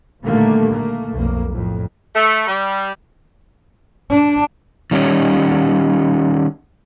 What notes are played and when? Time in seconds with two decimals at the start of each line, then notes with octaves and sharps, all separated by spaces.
0.23 A#2 D3 D#3 G3 A3 A#3
0.72 A3 A#3
1.13 B1 F2 A#3
1.51 F2 A2
2.15 A3
2.47 G3
4.11 D4
4.91 D#3 G3 A#3 C#4